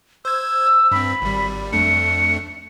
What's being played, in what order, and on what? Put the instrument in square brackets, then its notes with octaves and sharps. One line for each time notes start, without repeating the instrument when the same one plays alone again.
[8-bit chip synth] C5 G#6 [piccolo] E6
[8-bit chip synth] G2 C4 [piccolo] B5
[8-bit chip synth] G#1 G3
[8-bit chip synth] F2 A3 D4 [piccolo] C#7